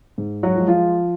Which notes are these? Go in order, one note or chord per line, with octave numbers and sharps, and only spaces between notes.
G#2
F#3 F#4
F3
G#3
F3 F4